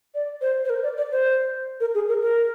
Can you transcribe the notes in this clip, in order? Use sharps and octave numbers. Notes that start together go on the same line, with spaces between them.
D5
C5
C5
A#4
D5
D5
C5
A#4
G#4
A#4
A#4